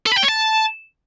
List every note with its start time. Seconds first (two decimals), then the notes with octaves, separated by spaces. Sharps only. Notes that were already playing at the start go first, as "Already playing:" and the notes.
0.06 A4
0.12 B5
0.18 G5
0.23 C#5
0.29 A5